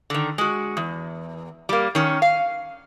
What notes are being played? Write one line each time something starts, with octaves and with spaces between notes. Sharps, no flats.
D3 D#3
G#3 F#4
E2
G3 A#3
D#3 C#4
F5